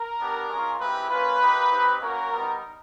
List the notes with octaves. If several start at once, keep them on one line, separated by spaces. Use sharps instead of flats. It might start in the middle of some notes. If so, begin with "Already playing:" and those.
Already playing: A#4
B3 D4 G4
G#3 C#4 F4
G#3 C4 E4 G4 B4
A#3 C#4 F4 B4
A#3 D#4 G4
C4 D#4 G4
A#3 C#4 F#4 A#4
G3 B3 D#4